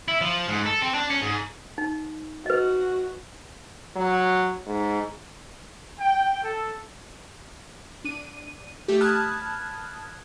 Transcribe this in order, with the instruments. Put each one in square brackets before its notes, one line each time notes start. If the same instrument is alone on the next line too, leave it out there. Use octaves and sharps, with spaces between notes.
[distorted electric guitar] E4
F3
G#2
A4
C4
D4
C#4
G#2
[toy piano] D#4
[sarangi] F#4 [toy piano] B4 D#5
[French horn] F#3
G#2
[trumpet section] G5
A4
[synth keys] D4 D#7
A3 G4
A5 B5 D#6 F6 F#6 G#6